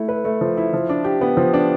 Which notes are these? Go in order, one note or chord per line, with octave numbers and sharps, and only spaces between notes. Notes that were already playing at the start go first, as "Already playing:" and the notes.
Already playing: A3 E4
B4
A3
F3
E4
F3
D4
G4
B3
F3
D4